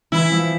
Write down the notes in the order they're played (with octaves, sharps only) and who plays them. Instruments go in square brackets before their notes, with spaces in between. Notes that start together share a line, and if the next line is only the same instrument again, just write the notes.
[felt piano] E3 [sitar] E4
[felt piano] F3